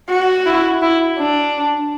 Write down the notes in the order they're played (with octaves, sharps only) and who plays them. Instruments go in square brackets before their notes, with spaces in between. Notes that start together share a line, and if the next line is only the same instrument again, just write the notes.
[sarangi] F#4
[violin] E4
E4
D4